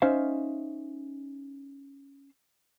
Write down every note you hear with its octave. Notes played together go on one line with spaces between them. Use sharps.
C#4 D#4 C5 E5 F5